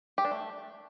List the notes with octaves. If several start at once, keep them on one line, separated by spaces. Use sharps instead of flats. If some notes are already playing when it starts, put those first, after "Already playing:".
G4
D4
A3